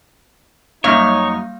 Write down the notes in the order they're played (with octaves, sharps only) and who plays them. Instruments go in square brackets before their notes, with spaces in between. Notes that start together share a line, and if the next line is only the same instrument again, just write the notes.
[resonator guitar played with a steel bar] F#2 [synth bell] G3 A#3 F5 [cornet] D#4 [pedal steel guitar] C#5